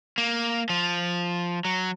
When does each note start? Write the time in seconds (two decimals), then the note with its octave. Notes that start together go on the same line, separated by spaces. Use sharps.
0.18 A#3
0.70 F3
1.65 F#3